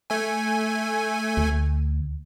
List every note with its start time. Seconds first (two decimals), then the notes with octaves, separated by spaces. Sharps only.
0.10 A3 G#5
1.37 D2